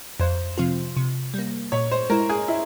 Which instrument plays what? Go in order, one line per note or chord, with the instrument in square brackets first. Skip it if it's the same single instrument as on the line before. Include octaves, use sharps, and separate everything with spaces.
[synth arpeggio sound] F2 [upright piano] C5
[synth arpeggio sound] C3 F3 C4 F4
C3
G3 A#3
[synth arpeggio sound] A#2 [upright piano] C#5
[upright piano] C5
[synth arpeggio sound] G#3 E4 [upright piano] A#4
[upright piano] G#4
E4